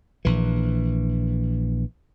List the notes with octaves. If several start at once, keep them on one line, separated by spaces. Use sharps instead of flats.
A#1 E3